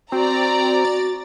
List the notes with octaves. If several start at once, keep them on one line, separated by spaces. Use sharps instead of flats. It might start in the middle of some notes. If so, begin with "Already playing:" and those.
C4 F#4 D5 A#5
A6